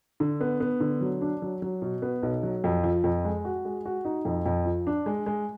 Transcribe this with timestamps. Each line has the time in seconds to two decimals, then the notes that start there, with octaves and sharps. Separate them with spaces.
0.20 D3
0.41 B3
0.60 B3
0.80 D3
1.01 F#3
1.22 D4
1.42 F#3
1.62 F#3
1.82 B2
2.02 B3
2.23 B1
2.43 F#3
2.64 F2
2.84 F3
3.04 F2
3.24 G#3
3.45 F#4
3.65 G#3
3.85 F#4
4.05 D#4
4.25 F2
4.46 F2
4.66 F3
4.87 D4
5.06 G#3
5.26 G#3